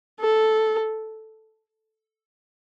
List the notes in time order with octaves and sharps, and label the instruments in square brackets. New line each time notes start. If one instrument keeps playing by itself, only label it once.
[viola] A4